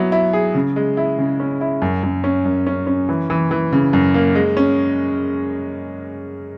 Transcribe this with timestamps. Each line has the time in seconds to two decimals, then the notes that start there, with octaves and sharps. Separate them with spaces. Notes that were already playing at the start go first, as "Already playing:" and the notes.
Already playing: F#3 B3 E4
0.12 E4
0.33 G#4
0.55 C#3
0.76 G#3
0.97 E4
1.18 C#3
1.40 C#4
1.61 E4
1.82 F#2
2.03 F#2
2.24 C#4
2.45 F#2
2.67 C#4
2.87 C#4
3.09 E3
3.30 E3
3.51 E3
3.72 C#3
3.93 F#2
4.14 A#3
4.35 G#3
4.57 C#4